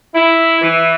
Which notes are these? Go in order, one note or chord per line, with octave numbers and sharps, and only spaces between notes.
E4
E3